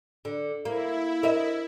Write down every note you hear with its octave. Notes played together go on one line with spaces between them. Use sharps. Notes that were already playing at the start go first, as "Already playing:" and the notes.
D3
A#3 E4
A#4 D#5 E5